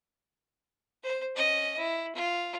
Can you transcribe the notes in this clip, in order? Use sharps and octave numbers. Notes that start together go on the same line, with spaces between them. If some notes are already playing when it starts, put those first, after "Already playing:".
C5
C#4 D#5
E4
F4